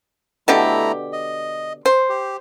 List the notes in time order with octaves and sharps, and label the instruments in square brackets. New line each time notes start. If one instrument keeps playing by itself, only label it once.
[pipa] B2 D3 G4 [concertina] A3 E4 A#5
[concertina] D#5
[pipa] C5
[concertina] G4